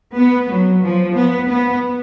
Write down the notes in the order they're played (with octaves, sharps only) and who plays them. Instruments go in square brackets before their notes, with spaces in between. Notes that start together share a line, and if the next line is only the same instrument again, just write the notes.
[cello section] B3
F#3
F3
B3
B3